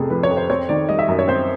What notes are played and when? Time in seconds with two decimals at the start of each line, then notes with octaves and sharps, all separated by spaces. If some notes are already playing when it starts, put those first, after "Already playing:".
Already playing: F2 C3 A3 G#4 A4
0.10 F3 B4
0.23 C#5
0.30 F2
0.37 C5
0.50 C4 C#5
0.69 D#3 D5
0.89 G3 D#5
0.99 E5
1.08 F#2
1.19 C#5
1.28 C4 C5